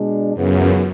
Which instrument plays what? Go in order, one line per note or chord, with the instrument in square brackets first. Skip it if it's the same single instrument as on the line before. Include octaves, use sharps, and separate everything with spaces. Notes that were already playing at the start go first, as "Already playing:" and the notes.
Already playing: [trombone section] B2 G#3 D4
[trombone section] C#2 C#3 E3 B3 [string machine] F#2